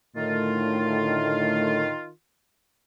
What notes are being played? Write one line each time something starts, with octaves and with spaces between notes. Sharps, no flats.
A2 D3 D#3 A3 F4